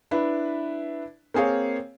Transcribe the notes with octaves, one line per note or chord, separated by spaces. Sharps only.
D4 E4 B4
A#3 C4 G#4 C#5 F5